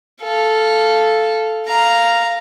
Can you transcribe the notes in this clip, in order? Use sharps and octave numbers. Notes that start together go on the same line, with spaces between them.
A4 F5
F5 A#5